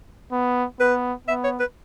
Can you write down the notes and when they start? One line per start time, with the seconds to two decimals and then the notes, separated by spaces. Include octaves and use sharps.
0.32 B3
0.80 B3 B4
1.27 B3 E5
1.44 C#5
1.59 B4